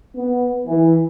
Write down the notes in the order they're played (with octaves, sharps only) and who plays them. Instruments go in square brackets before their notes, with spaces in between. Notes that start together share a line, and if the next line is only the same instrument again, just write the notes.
[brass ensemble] B3
E3